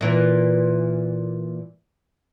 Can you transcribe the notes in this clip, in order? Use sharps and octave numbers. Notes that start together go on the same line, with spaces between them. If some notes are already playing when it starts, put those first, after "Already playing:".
A#2 E3